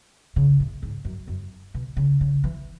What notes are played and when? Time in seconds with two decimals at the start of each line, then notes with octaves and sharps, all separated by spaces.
0.36 C#3
0.60 A2
0.83 G#2
1.05 F#2
1.28 F#2
1.74 B2
1.97 C#3
2.21 C#3
2.44 E3